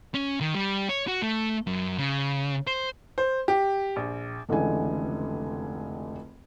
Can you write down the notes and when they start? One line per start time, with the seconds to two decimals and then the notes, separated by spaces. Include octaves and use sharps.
0.15 C#4
0.41 D#3
0.55 G3
0.89 C#5
1.08 F#4
1.22 A3
1.67 F#2
1.98 C#3
2.67 C5
3.18 C5
3.48 G4
3.96 A#1
4.49 F1 C#2 D3 E3 G#5